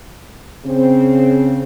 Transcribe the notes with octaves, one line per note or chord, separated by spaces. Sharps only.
C#3 C4